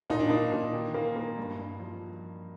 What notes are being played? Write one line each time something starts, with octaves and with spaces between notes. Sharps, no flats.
A#2 D#4
D4
A#3 D#4
A#2
D#3
A#3
A#3
G2
G2
F3